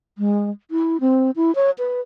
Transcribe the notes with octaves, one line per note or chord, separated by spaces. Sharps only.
G#3
E4
C4
E4
C#5
B4